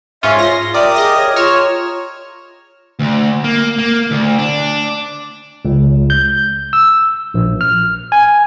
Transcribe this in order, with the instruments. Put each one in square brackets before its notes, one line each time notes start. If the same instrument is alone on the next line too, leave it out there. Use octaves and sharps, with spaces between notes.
[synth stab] G#2 C#4 F4 [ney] E5
[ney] F4 [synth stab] C6 A#6
[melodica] G4 A#4 D#6 [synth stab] D5 [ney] E5
[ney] G#4 [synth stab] D#5 A#6
[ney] C#5
[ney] F4 [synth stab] C#5 F6 E7 [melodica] A#5
[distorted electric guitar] D2
A#3
A#3
D2
D4
[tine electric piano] C#2
G6
E6
A#1
F6
G#5